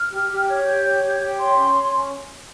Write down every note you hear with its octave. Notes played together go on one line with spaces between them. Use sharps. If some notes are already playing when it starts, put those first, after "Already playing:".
Already playing: F6
G4
G4
C#5
G4 G6
C#5
G4
G4
C#5 C6
C#4
C#5
C#4